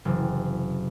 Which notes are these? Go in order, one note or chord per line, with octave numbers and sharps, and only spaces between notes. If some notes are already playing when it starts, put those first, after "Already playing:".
F#1 C3 E3